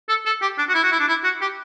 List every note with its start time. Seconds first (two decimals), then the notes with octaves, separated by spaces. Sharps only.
0.09 A4
0.26 A4
0.42 G4
0.58 D4
0.69 F#4
0.74 E4
0.83 F#4
0.92 E4
0.99 D4
1.08 E4
1.24 F#4
1.41 G4